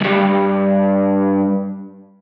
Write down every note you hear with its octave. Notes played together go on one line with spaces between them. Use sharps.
C#2 G2